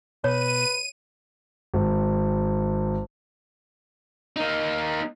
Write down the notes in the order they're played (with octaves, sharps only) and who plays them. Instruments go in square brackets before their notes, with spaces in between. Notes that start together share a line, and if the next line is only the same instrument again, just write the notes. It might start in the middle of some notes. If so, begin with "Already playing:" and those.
[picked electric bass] B2 [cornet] B4 [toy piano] C#5 [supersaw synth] D#7
[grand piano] G#1
[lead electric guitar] A#3 D#4